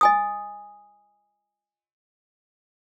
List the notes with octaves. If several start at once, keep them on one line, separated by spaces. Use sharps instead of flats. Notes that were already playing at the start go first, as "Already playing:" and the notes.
D#5 G#5 D#6